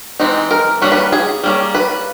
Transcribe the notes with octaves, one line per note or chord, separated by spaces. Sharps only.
E3 G#3 C4 D#4
A#4
G3 A#3 C#4 B4
B4
G#4
G3 A#3 C#4
B4